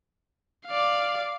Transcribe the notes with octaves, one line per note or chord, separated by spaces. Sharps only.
D5 F5